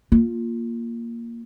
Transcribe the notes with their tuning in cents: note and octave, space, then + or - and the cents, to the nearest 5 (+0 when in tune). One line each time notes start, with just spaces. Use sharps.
A#3 +0 F4 +0